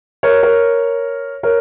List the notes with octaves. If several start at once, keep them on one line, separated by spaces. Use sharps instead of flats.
A#4 C#5
A#4 C#5
A#4 C#5